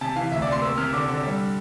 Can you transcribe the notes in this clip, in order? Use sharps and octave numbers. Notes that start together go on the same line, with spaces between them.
C3 A5
E3 F5
D2 E5
D5
C3
C6
A#3 E6
C3 F6
D3 D6
D3
G3